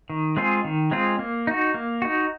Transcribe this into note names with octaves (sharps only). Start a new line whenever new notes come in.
D#3
G#3 C4 F4 G#4
D#3
G#3 C4 F4 G#4
A#3
D#4 F#4
A#3
D#4 F#4